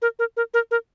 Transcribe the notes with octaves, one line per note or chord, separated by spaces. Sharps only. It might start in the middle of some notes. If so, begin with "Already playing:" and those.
A#4
A#4
A#4
A#4
A#4